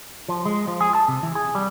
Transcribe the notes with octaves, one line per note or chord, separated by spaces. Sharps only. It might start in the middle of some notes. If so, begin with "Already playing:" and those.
F3
G#3
F3
G#4
A5
C3
E3
G#4
G3